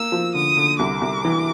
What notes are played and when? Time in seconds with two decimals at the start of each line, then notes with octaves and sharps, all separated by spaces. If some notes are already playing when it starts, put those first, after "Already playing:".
Already playing: A#3 E6
0.12 F3
0.34 D3 D#6
0.57 D3
0.79 C2 D6
1.01 C2
1.25 E3